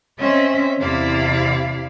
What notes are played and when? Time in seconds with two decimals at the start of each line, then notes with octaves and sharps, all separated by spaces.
0.18 C4 C#4 D#5 E5
0.79 E2 C3 E4 D5 F5